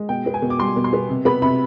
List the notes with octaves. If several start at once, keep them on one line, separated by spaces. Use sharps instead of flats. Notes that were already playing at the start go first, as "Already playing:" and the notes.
Already playing: G#3
B2 G5
B3
G#5
B2
D6
G3 C6
B2
C6
B3
C3
B3 B5
C3 B5